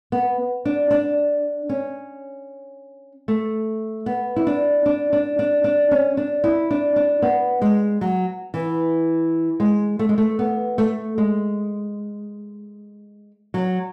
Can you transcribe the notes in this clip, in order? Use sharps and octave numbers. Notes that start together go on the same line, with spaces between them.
B3
D4
D4
C#4
A3
B3
E4
D4
D4
D4
D4
D4
C#4
D4
E4
D4
D4
B3
G#3
F#3
E3
G#3
A3
G#3
A3
B3
A3
G#3
F#3